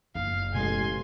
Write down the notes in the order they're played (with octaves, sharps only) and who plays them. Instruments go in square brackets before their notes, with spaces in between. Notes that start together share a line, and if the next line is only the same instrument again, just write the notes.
[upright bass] F#1 [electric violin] F5
[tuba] A1 [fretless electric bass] B2 G#3 [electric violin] G#5 C6